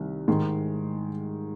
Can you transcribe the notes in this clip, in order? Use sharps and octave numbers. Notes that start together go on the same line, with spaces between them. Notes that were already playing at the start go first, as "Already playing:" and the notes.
Already playing: C2 C3 D#3
G#2 D#3 G#3